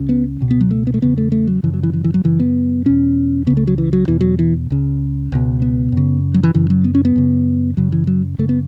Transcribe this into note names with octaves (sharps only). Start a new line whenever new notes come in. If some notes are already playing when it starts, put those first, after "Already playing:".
Already playing: C#2 C#3
B3
C#2 B2
B3
F#3
A3
B3
A3
E2 C#3 B3
A3
A3
F#3
F#2 C#3 E3
F#3
E3
E3
E3
F#3
F#2 C#3 E3
B3
E2 B2 C#4
C#2 C#3 B3
A3
F#3
E3
F#3
E2 B2 E3
F#3
E3
C#2 C#3
C#2 B2
B3
F#2 C#3
F#3
E3
F#2 C#3 E3
F#3
B3
C#4
B3
F#2 C#3
F#2 C#3 F#3
E3
F#3
F#2 C#3 A3
B3